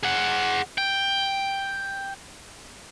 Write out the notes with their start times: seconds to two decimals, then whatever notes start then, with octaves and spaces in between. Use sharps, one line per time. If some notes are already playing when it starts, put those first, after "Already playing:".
0.03 G#4 F#5
0.78 G5